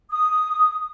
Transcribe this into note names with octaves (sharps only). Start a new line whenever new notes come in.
D#6